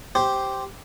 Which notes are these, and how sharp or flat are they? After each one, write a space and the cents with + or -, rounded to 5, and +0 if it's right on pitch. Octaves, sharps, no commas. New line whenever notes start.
G4 -5 C5 +0